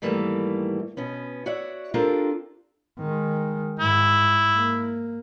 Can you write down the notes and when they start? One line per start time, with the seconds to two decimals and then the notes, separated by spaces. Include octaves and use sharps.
0.02 G#2 D#3 E3 G3 A3 A#3
0.97 B2 B3 C#4
1.46 F#4 C#5 D5 E5 F#5
1.94 C4 D4 F4 G4 A4 A#4
2.99 D#3 G#3
3.79 G#2 E4
4.56 A#3